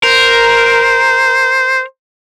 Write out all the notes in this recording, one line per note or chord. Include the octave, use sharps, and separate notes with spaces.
A#4 C5